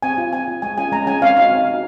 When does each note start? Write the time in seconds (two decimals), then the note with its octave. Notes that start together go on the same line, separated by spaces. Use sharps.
0.03 C4 G#5
0.18 F4
0.33 C4 G#5
0.48 F4
0.62 G#3 G#5
0.78 C#4 F4 G#5
0.92 G#3 A#5
1.07 C#4 F4 G#5
1.22 C4 F5
1.37 D#4 F#4 F5
1.51 C4
1.67 D#4 F#4